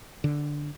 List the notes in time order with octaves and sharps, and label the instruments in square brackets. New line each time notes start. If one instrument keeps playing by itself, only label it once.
[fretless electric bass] D3